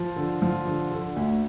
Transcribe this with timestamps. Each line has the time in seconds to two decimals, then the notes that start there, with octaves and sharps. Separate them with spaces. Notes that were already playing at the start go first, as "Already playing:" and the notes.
Already playing: F3
0.16 D3
0.42 F3
0.67 D3
0.92 D3
1.16 D2